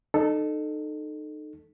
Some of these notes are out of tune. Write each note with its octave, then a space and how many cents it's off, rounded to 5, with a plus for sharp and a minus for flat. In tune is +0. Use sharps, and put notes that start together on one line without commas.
D#4 -30 A4 +0